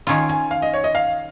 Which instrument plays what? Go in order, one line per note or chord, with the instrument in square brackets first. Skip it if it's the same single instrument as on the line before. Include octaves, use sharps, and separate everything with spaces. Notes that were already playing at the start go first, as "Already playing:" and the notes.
[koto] D#3 C#4 F4 [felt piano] G#5
[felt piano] G#5
F5
D#5
C#5
D#5
F5